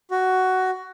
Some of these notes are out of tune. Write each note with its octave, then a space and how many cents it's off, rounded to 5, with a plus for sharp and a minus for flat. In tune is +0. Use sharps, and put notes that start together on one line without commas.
F#4 +10